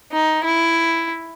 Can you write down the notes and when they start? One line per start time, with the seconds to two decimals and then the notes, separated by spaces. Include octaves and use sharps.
0.13 D#4
0.44 E4